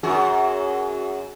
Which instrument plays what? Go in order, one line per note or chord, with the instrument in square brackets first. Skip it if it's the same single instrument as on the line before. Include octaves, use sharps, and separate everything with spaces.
[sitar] F#2 F#4 G#4